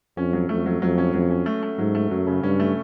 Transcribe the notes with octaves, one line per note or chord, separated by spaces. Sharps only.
F2 C#4
F#3
F2 A3
F#3
F2 F#3
C#4
F2 F#3
C#4
A3
A3
G#2 F#3
A3
F#2 F#3
C#3
G2 C#4
A3